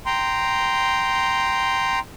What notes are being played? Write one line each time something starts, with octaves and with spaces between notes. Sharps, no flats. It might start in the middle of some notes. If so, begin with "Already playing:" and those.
G5 A#5 C6